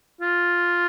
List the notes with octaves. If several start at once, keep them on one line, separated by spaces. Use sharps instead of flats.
F4